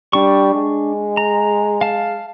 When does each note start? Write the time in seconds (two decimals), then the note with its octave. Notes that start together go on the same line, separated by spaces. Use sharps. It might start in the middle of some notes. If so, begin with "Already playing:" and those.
0.13 G3 D4 C#6
0.54 G#3
1.17 A#5
1.81 F5 A5